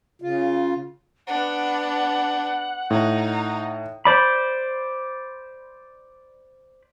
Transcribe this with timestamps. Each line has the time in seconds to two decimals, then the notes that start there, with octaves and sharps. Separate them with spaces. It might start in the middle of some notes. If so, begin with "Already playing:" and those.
0.22 C#3 F4
1.27 B3 D4 F#5
2.90 A2 D#4
4.05 C5 D5 B5